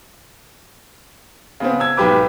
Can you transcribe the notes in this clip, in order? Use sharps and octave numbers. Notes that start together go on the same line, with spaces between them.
C#3 B3 C4
E6 G#6
B1 G#2 G4 B4 D6